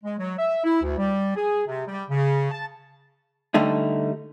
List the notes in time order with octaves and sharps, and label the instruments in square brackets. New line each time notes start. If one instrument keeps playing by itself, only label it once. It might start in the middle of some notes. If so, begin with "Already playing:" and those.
[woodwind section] G#3
F#3
E5
E4
D2
G3
G#4
C3
G3
C#3
A5
[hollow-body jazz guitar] D3 G3 A3 D#4